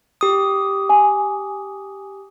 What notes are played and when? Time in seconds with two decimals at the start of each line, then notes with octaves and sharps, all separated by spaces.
0.21 G4 D#6
0.89 G#5